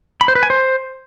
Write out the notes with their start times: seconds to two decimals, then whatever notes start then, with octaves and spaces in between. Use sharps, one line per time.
0.21 B5
0.28 C5
0.35 B4
0.43 G#5
0.50 C5